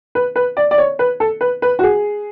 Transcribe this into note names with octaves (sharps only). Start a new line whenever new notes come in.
B4
B4
D5
D5
C#5
B4
A4
B4
B4
F#4
G#4